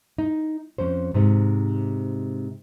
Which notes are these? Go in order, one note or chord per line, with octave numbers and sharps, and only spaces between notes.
D#4
F2 C#4 C5
G#2 C3 D#4